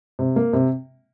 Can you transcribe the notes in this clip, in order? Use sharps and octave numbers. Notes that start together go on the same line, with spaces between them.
C3
A#3
C3